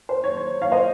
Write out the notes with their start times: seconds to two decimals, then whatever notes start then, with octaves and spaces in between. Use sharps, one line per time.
0.09 C5
0.24 C#5
0.37 C#5
0.62 C#5 F5
0.72 C5 D#5